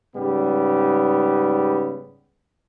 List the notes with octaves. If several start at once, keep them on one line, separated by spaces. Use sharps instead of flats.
G#2 C#3 G3 B3